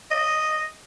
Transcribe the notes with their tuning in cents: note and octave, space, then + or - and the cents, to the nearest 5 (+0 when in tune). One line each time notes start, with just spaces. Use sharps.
D#5 -5